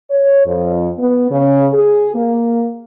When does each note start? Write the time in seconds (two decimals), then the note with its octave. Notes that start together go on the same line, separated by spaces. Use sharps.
0.11 C#5
0.46 F2
0.99 B3
1.31 C#3
1.73 G#4
2.15 A#3